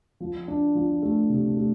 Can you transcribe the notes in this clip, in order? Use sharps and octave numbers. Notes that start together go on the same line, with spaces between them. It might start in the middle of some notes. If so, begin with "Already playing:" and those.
F3
D4
F3
A3
C3
A3